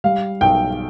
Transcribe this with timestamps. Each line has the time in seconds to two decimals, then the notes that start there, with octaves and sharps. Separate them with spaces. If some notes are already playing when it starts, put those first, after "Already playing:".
0.04 G3 F5
0.41 B1 G5